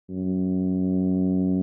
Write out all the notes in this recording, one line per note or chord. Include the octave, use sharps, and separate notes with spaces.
F#2